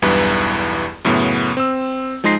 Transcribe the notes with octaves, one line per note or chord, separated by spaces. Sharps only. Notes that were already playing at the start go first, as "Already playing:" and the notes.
B1 E2 G2 E3 B4
F#2 A2 C#3 B3
C4 E6
F3 G#3 D#4 C6 A#6 C7